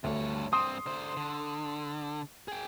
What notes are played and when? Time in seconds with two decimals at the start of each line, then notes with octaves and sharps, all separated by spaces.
0.04 D2 G2 C#5
0.53 G2 C4 C6 D#6
0.86 D3 C5
1.17 D3
2.48 G#4 G5